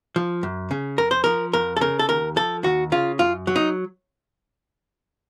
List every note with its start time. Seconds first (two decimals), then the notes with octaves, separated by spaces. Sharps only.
0.16 F3
0.43 F#2
0.71 C#3
0.98 F2 A#4
1.11 C5
1.24 F3 A#4
1.53 F2 A#4
1.77 A4
1.81 C#3 A#4
1.99 A4
2.09 D#2 A#4
2.36 F3 A4
2.64 D#2 F#4
2.92 C#3 F4
3.19 F#2 F4
3.47 F#3
3.56 D#4